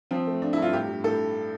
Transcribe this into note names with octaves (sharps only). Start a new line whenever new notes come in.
F3 C4
A3
F3 D4
E4
G2 F4
A2 G4
G3
A2 A4